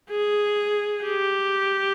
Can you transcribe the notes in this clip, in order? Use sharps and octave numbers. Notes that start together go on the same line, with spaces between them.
G#4
G4